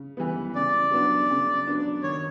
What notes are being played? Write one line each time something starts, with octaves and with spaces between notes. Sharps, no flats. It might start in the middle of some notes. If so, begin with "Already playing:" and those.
Already playing: C#3
E3 G3 B3
C#3 D5
F#3 B3 D4
C#3
F#3 B3 D4
D#3 C#5